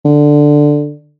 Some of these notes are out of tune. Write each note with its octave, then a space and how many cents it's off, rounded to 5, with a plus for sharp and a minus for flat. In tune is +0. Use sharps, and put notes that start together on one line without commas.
D3 +5